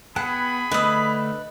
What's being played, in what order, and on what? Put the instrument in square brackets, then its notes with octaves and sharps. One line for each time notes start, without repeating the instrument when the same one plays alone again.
[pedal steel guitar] B3 G5 A5 [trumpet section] G#4 B5 [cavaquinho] F#5
[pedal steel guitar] D3 A3 E6 [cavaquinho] B4 D#6 [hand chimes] D#5